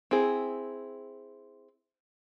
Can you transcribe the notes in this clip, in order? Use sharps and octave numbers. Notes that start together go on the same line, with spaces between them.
C4 E4 G#4